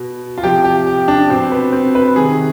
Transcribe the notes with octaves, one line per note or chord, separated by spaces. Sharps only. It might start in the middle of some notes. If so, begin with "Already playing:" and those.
Already playing: B2
F4
C3 F3 G4
G4
G4
D4
B2 C4
B3
C4
B4
C3 D#3 G#4